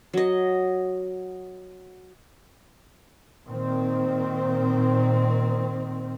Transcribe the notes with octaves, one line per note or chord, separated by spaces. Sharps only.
F#3 D#5
A#2 D#3 C4